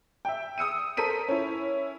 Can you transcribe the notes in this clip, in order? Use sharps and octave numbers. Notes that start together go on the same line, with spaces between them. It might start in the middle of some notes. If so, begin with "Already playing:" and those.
E5 G5
D#6 E6 C#7 D#7
A4 A#4 C5 B6 D#7
C#4 E4